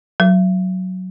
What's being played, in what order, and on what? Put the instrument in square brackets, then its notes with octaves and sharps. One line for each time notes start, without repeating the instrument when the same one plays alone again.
[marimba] F#3